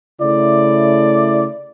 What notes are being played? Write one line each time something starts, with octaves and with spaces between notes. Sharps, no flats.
C#3 A3 E4 D5